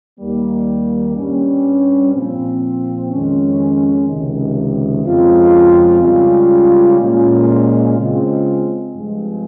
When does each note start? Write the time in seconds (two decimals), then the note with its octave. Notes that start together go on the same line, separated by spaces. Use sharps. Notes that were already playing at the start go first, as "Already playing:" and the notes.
0.19 D#2 D#3 G3 A#3
1.16 G2 G3 C#4
2.13 A#2 F3 C4
3.11 F2 D#3 G#3 C#4
4.08 C#2 C3 D#3
5.05 F2 C#3 G#3 C4 F4
6.02 C#2 C#3 G3 C#4 F4
7.00 A#2 G#3 C#4 F4
7.98 C#3 G#3 C4 F4
8.95 G2 F3 G#3 C4